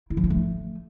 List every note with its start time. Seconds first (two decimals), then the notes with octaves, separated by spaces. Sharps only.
0.10 E4
0.17 F3
0.24 D4
0.30 A3